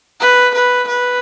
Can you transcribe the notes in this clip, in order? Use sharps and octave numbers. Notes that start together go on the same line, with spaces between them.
B4
B4
B4